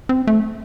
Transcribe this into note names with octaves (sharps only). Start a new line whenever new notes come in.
C4
A3